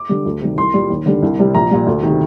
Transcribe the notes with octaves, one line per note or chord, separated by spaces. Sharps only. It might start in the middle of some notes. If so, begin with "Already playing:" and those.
Already playing: D6
D3 G3
D2
C3 D#3 G3
C2 C6
A#2 G3
D#2
D3 G3
C2
C3 G3
A#1 A#5
A#2 G3
D2
C3 D#3